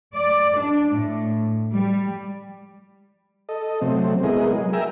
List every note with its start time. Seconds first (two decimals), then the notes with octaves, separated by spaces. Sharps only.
0.14 D5
0.57 D4
0.91 A2
1.73 G3
3.49 A4 D#5
3.81 C3 F#3 A3 C4
4.23 G#3 B3 E4 G#4 A#4 D#5
4.52 F#3 G#3
4.73 A#4 E5 G5 G#5 A#5 E6